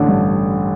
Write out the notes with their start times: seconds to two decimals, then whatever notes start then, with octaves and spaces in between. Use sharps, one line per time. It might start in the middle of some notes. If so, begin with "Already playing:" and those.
Already playing: A1 D3
0.08 G2